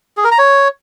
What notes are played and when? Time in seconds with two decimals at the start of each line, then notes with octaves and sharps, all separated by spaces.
0.17 G#4
0.24 A#4
0.31 A#5
0.39 C#5